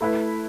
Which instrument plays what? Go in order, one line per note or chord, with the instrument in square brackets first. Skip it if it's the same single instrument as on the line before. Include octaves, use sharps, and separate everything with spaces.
[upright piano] A3 E4 B4